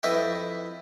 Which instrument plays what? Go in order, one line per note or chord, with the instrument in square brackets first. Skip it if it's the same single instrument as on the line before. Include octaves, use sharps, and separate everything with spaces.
[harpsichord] F2 E4 B4 D#5 E5 G5